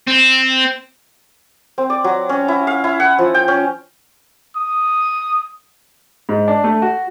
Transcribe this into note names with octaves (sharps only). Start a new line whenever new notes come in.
C4
C4
D5
F#3
C#4
E4
F5
E4
F#5
F3
G5
C#4
D#6
G#2
D4
A3
F#4